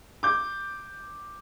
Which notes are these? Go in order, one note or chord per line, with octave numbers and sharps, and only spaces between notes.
D6 G6